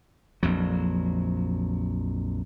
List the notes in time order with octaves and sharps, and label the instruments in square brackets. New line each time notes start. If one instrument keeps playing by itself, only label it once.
[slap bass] A#1 F2 F#3